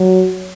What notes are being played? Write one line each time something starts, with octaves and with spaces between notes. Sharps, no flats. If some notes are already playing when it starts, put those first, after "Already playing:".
Already playing: F#3